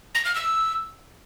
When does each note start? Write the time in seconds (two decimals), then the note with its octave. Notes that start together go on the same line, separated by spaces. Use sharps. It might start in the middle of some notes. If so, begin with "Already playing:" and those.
0.15 A#6
0.25 F6
0.35 E6